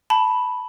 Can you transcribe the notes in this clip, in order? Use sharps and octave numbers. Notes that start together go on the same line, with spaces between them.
A5 B5